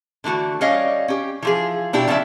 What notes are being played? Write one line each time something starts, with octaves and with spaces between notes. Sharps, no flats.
D3 E3 A3 F#4
G3 C#4 C#5 D#5 F5
C#4 G4
E3 F3 G#4
B2 D4 E4 G4
C#3 F3 B3 D5 E5